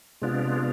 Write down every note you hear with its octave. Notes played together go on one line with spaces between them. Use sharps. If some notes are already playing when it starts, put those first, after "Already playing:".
C3 G#3 B3 D4 F4